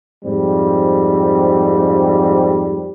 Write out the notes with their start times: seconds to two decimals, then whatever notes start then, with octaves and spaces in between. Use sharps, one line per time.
0.24 F2 G#2 G3 C4